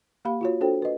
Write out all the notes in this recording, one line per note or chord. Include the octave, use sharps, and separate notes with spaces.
A#3 G4 F5 B5
F4 F#4 C#5
D4 F#4 A4 C5 C#5 G5
B4 D#5